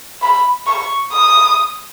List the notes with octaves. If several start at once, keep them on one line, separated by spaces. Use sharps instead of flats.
B5
C#6
D#6